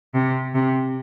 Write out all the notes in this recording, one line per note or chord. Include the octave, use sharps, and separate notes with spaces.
C3
C3